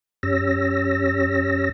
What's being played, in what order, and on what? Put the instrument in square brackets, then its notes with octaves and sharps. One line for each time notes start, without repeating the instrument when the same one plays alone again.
[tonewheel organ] F#2 C#4 G4 C#5 E6 A#6